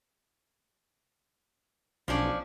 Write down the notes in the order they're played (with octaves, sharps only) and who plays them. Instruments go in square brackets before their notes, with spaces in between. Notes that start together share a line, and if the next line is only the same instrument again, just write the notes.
[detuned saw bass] B1 [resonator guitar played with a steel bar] F3 C#4 D4